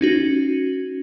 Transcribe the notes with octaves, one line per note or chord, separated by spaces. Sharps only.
C#4 D#4 F#4